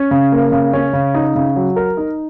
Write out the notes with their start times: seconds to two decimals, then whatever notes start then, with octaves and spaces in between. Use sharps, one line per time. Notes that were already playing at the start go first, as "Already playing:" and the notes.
Already playing: C#4
0.11 C#3
0.32 A#3
0.52 C#3
0.73 C#4
0.93 C#3
1.15 D#4
1.35 C#3
1.56 F#3
1.76 A#4
1.97 D#4